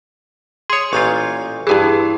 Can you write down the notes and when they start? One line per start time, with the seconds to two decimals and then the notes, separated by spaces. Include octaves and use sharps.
0.70 G#4 C#5 C6 D#6
0.93 A1 A#2 F4 C#6 G6 G#6
1.67 G2 E3 E4 G4 G#4